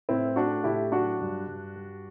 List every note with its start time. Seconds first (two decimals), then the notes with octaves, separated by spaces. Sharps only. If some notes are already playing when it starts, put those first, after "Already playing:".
0.09 A2 C4 E4
0.36 A3 D4 F#4
0.64 A2 E4 G4
0.92 F#3 D4 F#4
1.21 G2
1.47 G2
1.75 G3